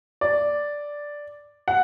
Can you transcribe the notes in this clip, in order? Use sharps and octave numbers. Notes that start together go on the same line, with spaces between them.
D5
F#5